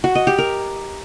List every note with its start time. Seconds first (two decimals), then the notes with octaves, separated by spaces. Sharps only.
0.04 F#4
0.15 D#5
0.27 G4
0.38 A#4